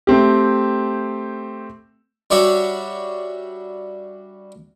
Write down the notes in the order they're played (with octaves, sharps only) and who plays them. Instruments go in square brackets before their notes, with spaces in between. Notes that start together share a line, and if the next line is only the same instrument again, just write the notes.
[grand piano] A3 C4 G4
[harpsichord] G3 D4 F#4 C#5 E5